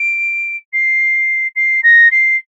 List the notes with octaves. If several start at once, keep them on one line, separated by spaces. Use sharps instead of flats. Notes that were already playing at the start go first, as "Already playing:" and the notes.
Already playing: D7
C7
C7
A#6
C7